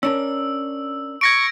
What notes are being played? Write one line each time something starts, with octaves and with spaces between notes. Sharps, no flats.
C#4 D4 A#4 E6
C#6 G#6 A#6 D7